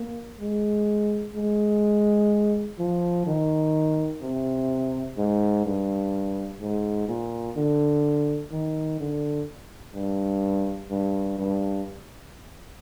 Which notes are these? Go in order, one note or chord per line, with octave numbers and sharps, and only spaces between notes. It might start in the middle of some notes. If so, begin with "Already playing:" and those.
Already playing: A#3
G#3
G#3
F3
D#3
C3
G#2
G2
G#2
A#2
D3
D#3
D3
G2
G2
G2